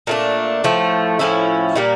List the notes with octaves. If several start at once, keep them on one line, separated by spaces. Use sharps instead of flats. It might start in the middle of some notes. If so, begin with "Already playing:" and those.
A#2 A3 D4
A2 F3 A3
A2 F3 C#4 E4
A#2 G3 A#3